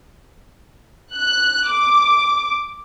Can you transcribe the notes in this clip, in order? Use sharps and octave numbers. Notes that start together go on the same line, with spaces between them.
F#6
D6